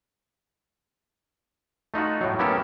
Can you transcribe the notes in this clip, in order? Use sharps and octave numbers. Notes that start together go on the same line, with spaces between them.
A3 D#4 F4 F#4
A2 F#3
A#3 B3 C#4 E4 G4 A4